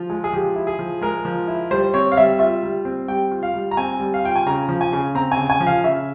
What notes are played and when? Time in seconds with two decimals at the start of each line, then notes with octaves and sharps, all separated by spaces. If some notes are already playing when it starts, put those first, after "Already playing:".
Already playing: F3 F4
0.10 G#3
0.24 G#4
0.33 F3 G4
0.56 E4
0.67 G#4
0.79 F3
1.01 G#3 A#4
1.25 F3
1.48 E4
1.71 G3 C5
1.94 C4 C#5
2.12 F5
2.17 G3 E5
2.39 F4 E5
2.63 G3
2.85 C4
3.08 G3 G5
3.31 F4
3.43 F5
3.54 G3
3.71 A#5
3.77 C4 G#5
4.00 G3
4.14 F5
4.24 F4 G5
4.36 G#5
4.47 C#3 A#5
4.69 F3
4.81 G#5
4.92 C#3
5.15 C4 A#5
5.32 G#5
5.37 C#3
5.50 G#5
5.60 F3
5.67 F5
5.84 C#3 E5